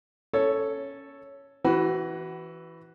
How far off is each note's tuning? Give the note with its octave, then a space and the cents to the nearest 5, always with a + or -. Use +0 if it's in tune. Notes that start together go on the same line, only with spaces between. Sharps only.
C#4 +0 A4 +0 C#5 +0
E3 +0 F#4 +25 B4 +0